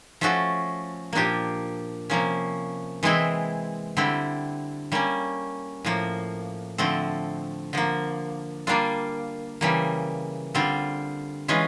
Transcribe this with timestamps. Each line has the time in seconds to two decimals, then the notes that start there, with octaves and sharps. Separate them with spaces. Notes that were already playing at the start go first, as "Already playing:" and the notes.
0.21 F3 A3 C#4 F#4 A4
1.13 A#2 F3 A#3 D4 G4
2.10 C3 F3 A#3 C#4
3.03 E3 G#3 C4 E4 G#4
3.97 D3 G3 C4 E4
4.92 G3 A#3 C#4
5.85 A2 F3 A#3
6.78 D3 F3 A3 C4
7.73 D3 F3 A#3
8.67 G3 A#3 D4 F4
9.61 C#3 E3 G3 A#3
10.55 D3 G3 C4 F4
11.48 E3 G#3 C#4 F4